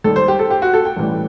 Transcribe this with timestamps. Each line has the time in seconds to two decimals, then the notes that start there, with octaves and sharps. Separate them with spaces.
0.04 D#2 D#3 G3 A4
0.16 C5
0.28 G4
0.39 A4
0.50 G4
0.62 F#4
0.74 A4
0.85 G5
0.97 A1 A2 E3 G3